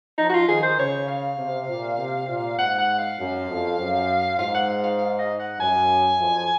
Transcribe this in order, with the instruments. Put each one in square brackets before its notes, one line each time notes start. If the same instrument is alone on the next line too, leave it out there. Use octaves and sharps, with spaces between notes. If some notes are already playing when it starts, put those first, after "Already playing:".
[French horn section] F3 [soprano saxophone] D#4
[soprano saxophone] F#4
F4
[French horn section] D#3 [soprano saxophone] G#4
[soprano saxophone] C5
[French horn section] C#3 [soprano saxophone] C#5
[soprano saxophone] F5
[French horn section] C3
A#2
C3
A#2
[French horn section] G#2 [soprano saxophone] F#5
[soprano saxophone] F#5
F5
[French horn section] F#2
F2
F#2
[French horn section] G#2 [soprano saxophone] F5
[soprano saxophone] F#5
F5
F5
F5
D#5
F#5
[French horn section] F#2 [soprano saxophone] G#5
[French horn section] F2